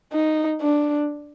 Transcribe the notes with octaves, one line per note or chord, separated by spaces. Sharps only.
D#4
D4